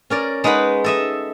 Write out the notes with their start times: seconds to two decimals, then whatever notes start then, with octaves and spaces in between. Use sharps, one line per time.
0.10 C#4 A#4 D5
0.44 G#3 D#4 B4 F#5 B5
0.84 A4 D#5 E5